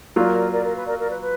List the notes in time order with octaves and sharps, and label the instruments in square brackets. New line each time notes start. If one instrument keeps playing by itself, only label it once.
[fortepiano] F#3 A#3 F4 [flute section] A#4 D5
[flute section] A#4 D5
A#4
B4
A#4 D5
A#4 D5
B4
B4